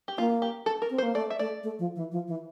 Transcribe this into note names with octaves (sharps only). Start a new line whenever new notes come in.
G4
A#3 F4
G4
A4
A#4
C4
C5
A#3
A3 D5
E5
A3 D5
A3
F3
E3
F3
E3